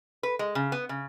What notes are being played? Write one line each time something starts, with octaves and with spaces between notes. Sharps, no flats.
B4
G#3
C#3
B3
C#3